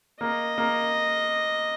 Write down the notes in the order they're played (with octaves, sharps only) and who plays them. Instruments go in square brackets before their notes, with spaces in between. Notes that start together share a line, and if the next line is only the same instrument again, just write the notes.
[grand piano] A#3 [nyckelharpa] D#5
[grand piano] A#3